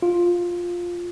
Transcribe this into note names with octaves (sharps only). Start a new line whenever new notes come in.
F4